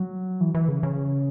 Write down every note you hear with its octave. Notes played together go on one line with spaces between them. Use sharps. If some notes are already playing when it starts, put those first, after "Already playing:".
Already playing: F#3
E3
E3
C#3
C#3